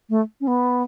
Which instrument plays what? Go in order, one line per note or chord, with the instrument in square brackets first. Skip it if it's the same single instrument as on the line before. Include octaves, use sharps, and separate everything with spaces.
[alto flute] A3
C#4
B3